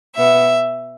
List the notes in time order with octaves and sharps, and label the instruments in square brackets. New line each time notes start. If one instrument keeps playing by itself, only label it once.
[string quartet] B2 B3 E5